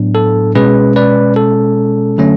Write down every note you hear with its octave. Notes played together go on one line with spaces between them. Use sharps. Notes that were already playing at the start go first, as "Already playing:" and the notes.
Already playing: A2 F#3 B3 D4
A4
B2 G#3 C#4 G#4 B4
B4 D5
A4
D3 F#3 A3 C#4